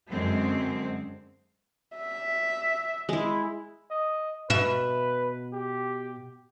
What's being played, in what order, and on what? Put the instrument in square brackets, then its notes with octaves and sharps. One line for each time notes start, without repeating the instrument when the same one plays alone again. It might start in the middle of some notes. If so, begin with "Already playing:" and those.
[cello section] F#2 D3 G#3 C4
[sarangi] E5
[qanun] G#3 E4
[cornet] D#5
[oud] B2 E5 [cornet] B4
[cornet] G4